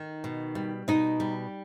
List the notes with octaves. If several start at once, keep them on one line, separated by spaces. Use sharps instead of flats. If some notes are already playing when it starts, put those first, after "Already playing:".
Already playing: D#3
B2
G3
B2 D#4
G3